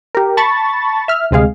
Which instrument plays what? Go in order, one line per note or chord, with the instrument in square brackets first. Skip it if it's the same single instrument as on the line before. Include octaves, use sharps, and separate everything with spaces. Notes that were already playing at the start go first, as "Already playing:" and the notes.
[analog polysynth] G4 A#4
A5 B5 C#6 A6
E5 F6
D2 C3 G#3 G#4 F5